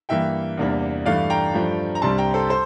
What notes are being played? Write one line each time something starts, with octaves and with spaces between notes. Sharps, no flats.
G2 E3 A#3 E5 G5
E2 C3 G3 A#3 D4
G2 E3 A3 D4 D5 F5
G5 A#5
G2 F3 A3 D4
A#5
C2 C3 G3 D4 A5 C6
G5 A#5
A4 C5
A4 C5